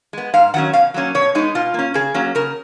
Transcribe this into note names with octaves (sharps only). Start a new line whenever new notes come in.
G#3 B3
G#2 F5
D#3 F#3 C#4 F#5
B2 F5
F#3 A#3 C#4
B2 C#5
G#3 B3 D#4
B2 F4
A#3 C#4
C#3 G#4
F#3 A#3 C#4
C#3 A#4